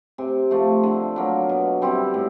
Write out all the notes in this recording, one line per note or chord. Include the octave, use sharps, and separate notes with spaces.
C3
F3 A3
D3
F#3 A#3
B2
G3 C4 E4
A2